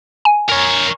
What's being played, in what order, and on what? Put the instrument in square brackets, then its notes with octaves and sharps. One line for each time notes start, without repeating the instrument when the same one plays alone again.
[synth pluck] G#5
[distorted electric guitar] A#4 C#5